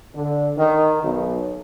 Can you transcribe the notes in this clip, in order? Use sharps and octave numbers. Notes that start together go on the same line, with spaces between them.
D3
D#3
B1